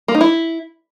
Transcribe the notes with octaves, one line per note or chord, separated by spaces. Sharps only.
A#3
D#4
E4